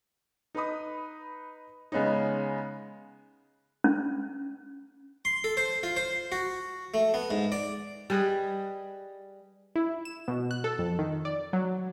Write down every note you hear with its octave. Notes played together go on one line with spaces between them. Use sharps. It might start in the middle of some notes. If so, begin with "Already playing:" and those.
D#4 B4 B5 D#6
C#3 G#3 B3 C#4 D#4
C#4
C6
A4
C5
F4
C5
F#4
A3
B3
G#2
D5
G3 G#4 B4 D#5
E4
E7
B2
F#6
A4
F2
D#3
D5
F#3